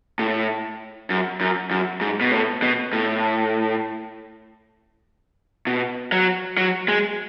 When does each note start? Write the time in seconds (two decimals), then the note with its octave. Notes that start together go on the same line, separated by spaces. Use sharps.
0.19 A2
1.10 F#2
1.41 F#2
1.71 F#2
2.01 G#2
2.21 B2
2.32 A2
2.62 B2
2.93 A2
5.67 B2
6.12 F#3
6.57 F#3
6.88 G#3